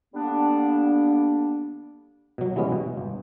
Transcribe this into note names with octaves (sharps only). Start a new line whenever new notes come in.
D3 G3 A#3 B3 D4
B2 F#3
E3 G3 G#3 B3 C#4
B2
G1